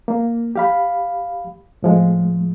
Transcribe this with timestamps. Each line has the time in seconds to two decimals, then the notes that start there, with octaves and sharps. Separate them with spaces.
0.08 A#3
0.56 G4 F5 B5
1.83 A2 F3 G#3